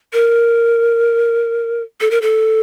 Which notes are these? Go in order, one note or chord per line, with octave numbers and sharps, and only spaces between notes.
A#4
A4
A#4
A4